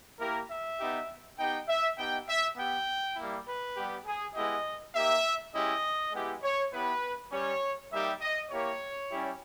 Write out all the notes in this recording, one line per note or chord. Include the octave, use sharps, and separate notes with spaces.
A#3 E4 G4 A#4
E5
B3 D#4 G4
B3 D#4 G4 G5
E5
B3 D#4 G4 G5
E5
B3 G4 G5
G3 A#3 E4
B4
G3 B3 G4
G#4
G#3 B3 E4 G4 D#5
A#3 D#4 G4 E5
G#3 C#4 E4 G4 D#5
G#3 B3 E4 G4
C#5
B3 E4 G4 B4
G3 C#4 G4 C#5
G3 A#3 D#4 G4 E5
D#5
A#3 E4 G4 C#5
G3 C#4 E4 G4